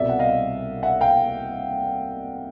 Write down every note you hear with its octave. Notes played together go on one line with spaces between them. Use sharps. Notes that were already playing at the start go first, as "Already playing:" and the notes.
Already playing: C2 B2 G3 D5 E5
F#5
D#5 F5
E5 F#5
F5 G5